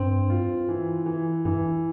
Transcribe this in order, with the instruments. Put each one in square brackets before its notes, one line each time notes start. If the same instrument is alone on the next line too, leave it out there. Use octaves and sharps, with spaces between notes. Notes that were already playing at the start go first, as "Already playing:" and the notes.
Already playing: [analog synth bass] G2 [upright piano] C4
[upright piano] F4
E3
E3
[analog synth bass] G2 [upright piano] E3